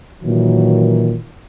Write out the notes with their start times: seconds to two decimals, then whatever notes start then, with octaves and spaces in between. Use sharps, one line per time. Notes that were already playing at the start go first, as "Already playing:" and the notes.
0.23 A#2 D#3 E3 F#3